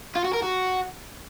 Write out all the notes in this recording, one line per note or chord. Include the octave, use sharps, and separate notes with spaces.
F4
F#4
A#4
F#4